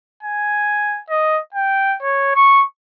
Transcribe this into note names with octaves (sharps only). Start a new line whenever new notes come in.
G#5
D#5
G5
C#5
C#6